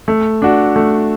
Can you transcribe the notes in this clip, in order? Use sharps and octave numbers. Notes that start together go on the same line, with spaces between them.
A3
D4 F#4
A3